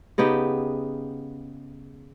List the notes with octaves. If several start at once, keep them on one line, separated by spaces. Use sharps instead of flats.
C#3 B3 D#4 G4